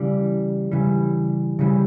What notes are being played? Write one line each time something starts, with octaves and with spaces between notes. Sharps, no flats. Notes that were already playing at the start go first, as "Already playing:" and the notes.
Already playing: C#3 E3 G3
C#3 E3 G3
C#3 E3 G3